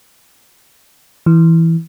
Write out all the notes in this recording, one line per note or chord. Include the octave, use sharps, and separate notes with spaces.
E3